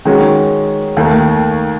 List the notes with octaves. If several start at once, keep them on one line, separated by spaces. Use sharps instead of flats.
D#3 G#3 C#4 F#4
D#2 D#3 A3